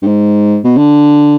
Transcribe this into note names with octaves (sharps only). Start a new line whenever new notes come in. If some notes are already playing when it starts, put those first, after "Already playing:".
G2
G#2
B2
D3